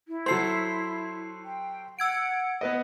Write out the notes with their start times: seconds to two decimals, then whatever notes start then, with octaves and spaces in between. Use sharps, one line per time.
0.08 E4
0.26 F#3 A4 C5 C6 C7
1.45 G5
1.99 F#5 E6 G#6 D7
2.61 B3 B4 D#5